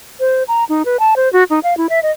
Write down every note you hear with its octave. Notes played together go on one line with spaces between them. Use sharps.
C5
A#5
D#4
B4
A5
C5
F#4
D#4
F5
E4
E5
D#5